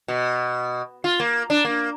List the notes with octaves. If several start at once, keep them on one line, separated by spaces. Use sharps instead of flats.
B2
F4
A#3
D4
A#3